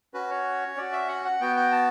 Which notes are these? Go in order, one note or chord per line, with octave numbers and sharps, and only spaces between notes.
C#4 F#4 B4
C#5
C#4 F#4 D5
E5
F#5
F#5
B3 F#4 G5
G5
A5